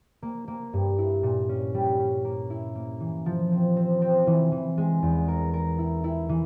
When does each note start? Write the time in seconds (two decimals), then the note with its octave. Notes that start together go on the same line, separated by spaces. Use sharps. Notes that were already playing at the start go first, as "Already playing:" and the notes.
0.22 A#3
0.48 A#3
0.73 G2
0.98 E4
1.23 A#2
1.49 C#4
1.74 G3
1.99 C#4
2.25 A#3
2.50 E4
2.75 A#3
3.00 E3
3.26 F3
3.52 C4
3.76 C4
4.02 C4
4.27 E3
4.52 E3
4.78 G#3
5.02 E2
5.28 A#4
5.54 A#4
5.78 E4
6.04 E4
6.29 E3